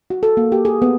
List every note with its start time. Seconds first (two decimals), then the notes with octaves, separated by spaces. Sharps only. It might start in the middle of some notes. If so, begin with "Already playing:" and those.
0.10 F#4
0.23 A4
0.37 A#3
0.52 G4
0.65 G#4
0.82 B3